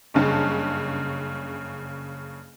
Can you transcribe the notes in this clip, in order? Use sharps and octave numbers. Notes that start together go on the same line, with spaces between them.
F#1 G2 C#3 A5